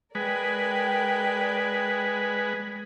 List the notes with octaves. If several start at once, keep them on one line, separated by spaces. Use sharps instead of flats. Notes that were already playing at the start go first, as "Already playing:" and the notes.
G#3 A#4 B4 D5 G5